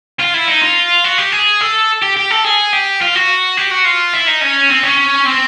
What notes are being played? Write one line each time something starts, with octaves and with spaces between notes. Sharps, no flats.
F4
E4
D#4
F4
F#4
G4
G#4
A4
G4
G4
A4
G#4
G4
F4
F#4
G4
F#4
F4
E4
D#4
C#4
C4
C#4
C4